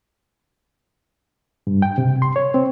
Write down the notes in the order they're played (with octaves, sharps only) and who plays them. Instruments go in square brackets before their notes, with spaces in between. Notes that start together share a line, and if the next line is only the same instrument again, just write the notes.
[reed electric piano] G2
G5
C3
C6
C#5
C4